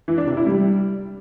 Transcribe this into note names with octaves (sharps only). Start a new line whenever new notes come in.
E3
D4
C3
E4
G3